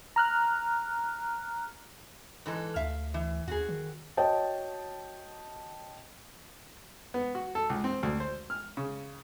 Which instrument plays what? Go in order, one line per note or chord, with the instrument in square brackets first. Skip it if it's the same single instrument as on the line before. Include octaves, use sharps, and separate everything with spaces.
[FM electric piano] A#5 F6 F#6
[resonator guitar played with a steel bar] G#2 E3 A4
[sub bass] D2 [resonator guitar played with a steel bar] E5 F5
[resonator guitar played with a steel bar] E3
[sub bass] D#2 [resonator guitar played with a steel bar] F#4 G#4
[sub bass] D#3
[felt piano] F#4 C#5 D#5 G5 A5
[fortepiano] B3
F#4
A4
C#2
C4
D2
C5
F6
C#3